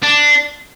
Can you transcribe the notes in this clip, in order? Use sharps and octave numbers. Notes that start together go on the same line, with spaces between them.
D4